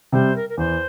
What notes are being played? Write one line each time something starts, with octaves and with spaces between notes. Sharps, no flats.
C3 G3 C5
A#4
A#4
E2 C5